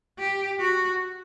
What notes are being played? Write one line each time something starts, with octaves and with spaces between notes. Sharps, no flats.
G4
F#4